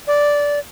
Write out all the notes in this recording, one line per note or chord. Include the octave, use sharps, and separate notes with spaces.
D5